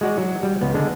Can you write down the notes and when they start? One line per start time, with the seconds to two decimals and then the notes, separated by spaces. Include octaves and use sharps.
0.01 G#3 F#4 D5
0.18 F#3
0.43 G3
0.61 C#2 B3
0.74 D3 G#3 D4